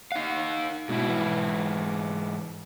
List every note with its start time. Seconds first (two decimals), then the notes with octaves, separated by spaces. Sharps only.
0.12 D#4 F5 F#5
0.89 G#2 B2 E4
1.09 E3